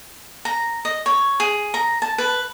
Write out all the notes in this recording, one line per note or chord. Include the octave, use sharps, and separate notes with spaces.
A#5
D#5
C#5
G#4
A#5
A5
B4